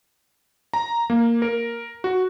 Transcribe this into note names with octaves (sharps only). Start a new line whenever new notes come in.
A#5
A#3
A#4
F#4